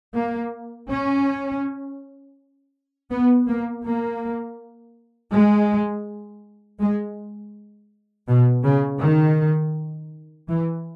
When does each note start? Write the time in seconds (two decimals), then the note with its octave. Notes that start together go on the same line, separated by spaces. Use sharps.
0.15 A#3
0.89 C#4
3.11 B3
3.47 A#3
3.85 A#3
5.32 G#3
6.80 G#3
8.28 B2
8.63 C#3
9.01 D#3
10.48 E3